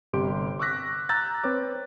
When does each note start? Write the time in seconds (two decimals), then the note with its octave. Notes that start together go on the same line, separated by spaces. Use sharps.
0.13 G1 C3 G4 C6 D7
0.59 C#6 D6 E6 F#6 A#6 B6
1.09 A#5 E6 F#6 G6 A6
1.44 C4 B4 C#5 D6